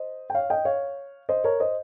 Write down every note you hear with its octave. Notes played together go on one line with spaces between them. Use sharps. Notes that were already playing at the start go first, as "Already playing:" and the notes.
Already playing: C5 D#5
G5
C#5 F5
D#5 G5
C#5 F5
C5 D#5
A#4 C#5
C5 D#5